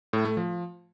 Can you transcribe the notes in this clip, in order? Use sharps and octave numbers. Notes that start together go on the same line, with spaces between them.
A2
A3
F3